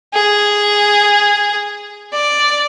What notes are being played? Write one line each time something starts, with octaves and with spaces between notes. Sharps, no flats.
G#4
D5